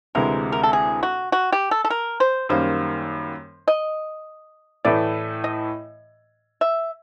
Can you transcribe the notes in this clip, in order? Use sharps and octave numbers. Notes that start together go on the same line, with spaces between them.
D2 C3 E3 G#3 A#4
A#4
A4
G#4
F#4
F#4
G4
A4
A4
A#4
C5
F#2 D#3 G3 A#3 C5
D#5
A2 E3 A3 D5
D#5
E5